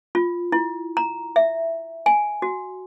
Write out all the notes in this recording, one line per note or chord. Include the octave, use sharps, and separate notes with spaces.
F4
E4
A#5
E5
G#5
F#4